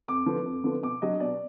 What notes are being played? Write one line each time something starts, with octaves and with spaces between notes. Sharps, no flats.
F2 D6
D3 F3 B3
F2
D3 F3 B3
B2 D6
F#3 D4 D#5
B2 D5